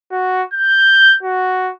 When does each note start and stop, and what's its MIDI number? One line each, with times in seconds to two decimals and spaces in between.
0.12 0.42 66
0.54 1.15 91
1.23 1.71 66